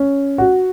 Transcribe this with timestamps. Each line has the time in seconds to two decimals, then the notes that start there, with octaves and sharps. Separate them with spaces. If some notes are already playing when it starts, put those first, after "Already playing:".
Already playing: C#4
0.38 F#4